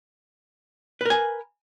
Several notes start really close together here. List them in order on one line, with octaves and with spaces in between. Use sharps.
B4 A#4 G#5